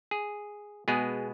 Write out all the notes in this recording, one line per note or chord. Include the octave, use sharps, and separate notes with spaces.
G#4
B2 G#3 B3 G#4